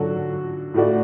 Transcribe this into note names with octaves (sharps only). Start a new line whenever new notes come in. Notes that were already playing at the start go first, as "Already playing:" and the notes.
Already playing: D3 F#3 D4 F#4 A4
A2 A3 F#4 D5